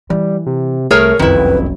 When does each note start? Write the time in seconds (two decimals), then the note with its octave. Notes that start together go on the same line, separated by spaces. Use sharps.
0.10 E3 G3
0.47 C3
0.91 C2 A3 G#4 A#4 C#5
1.19 F#1 C2 F2 D#3 E4 B4